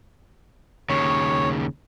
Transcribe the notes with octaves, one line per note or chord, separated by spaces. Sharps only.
D#2 C#3 C#5